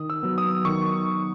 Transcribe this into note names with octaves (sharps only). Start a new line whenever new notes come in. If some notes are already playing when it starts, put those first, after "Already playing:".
Already playing: D#3 D#6
E6
F#3 B3
D#6
D#3 C#6